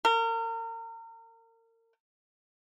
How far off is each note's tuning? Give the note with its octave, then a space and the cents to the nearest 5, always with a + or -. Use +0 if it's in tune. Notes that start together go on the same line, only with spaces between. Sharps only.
A#4 -35